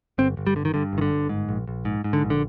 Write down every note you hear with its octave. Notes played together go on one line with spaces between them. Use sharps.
G1 C4
G1
G3
D3
D#3
G2 D3
G1 D#3
D3
G1
G#2
A#1
A#1
G#2
G#2
D3
A#1
D3